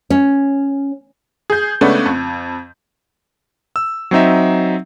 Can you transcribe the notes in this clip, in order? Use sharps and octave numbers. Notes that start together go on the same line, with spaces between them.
C#4
G#4 G6
C#3 G#3 A3 B3 C#4 D4
F2
E6
F#3 C4 D#4 E5